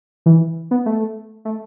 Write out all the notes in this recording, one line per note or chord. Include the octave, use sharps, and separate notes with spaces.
E3
B3
A3
A3